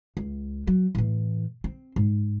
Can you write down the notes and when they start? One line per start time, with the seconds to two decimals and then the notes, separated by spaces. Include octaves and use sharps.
0.17 C#2
0.67 F#3
0.95 A2 E3
1.64 C4
1.96 G#2